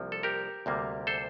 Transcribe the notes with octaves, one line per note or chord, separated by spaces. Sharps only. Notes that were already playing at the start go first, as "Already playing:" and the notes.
Already playing: C2 C3 F3 A#3
A4
G4 A#4
D2 C3 G3 A#3
A4 C5